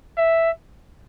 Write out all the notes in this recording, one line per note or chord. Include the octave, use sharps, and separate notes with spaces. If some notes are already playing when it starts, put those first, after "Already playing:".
E5